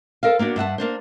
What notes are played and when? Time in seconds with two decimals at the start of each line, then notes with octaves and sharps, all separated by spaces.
0.23 A4 A#4 C5 F5
0.39 A#3 B3 D4 F#4
0.56 G2 E5 F#5 A5
0.78 A#3 D4 C5